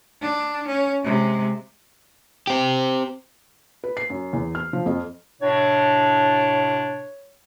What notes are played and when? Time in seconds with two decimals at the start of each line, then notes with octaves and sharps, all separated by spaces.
0.22 D4
0.67 C#4
1.03 C3 G#3
2.47 C4 G4
3.84 B4
3.97 C7
4.10 F#2
4.33 E2
4.55 F6
4.73 F3
4.86 F2
5.42 A2 C3 D4 C#5